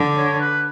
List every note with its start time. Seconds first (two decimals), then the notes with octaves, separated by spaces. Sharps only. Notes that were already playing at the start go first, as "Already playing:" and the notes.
Already playing: D3
0.17 C#5
0.40 B4